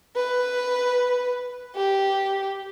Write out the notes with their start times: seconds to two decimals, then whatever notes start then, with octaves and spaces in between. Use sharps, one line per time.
0.16 B4
1.76 G4